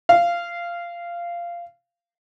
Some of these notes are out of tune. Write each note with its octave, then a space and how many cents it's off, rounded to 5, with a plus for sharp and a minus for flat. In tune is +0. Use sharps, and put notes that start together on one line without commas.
F5 -15